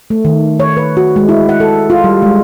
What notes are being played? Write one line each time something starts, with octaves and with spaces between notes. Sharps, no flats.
A3
D#3
C#5
B4
F#4
G#3
E4
F#5
A4
F4
G3
G#3